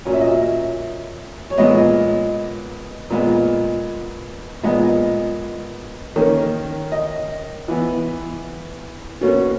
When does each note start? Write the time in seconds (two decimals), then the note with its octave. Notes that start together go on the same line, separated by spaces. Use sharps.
0.05 A#2 F#3 C#4
0.13 E5
0.21 D#5
0.29 E5
1.50 C#5
1.58 A#2 G#3 B3 D#5
3.10 A#2 G#3 B3
4.63 A#2 G#3 B3 D#5
6.16 D#3 A#3 C#4
6.92 D#5
7.68 E3 B3
9.21 B2 A#3 C#4 C#5